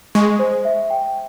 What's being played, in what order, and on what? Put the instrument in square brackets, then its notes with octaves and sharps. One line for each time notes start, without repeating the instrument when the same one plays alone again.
[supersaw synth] G#3 [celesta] C#6
[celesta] C5
E5
G5